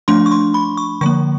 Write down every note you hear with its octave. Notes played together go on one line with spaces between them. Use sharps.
F3 A3 D4 C6
C#6
C6
B5
C#6
D3 F3 A#3 C#6